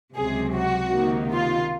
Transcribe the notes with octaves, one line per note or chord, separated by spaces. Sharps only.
C#2 C3 F#3 G#4
F#4
C#2 C3 D#3 A#3 D#4
F4